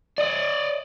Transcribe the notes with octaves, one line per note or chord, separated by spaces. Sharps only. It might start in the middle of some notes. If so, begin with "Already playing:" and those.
D5 D#5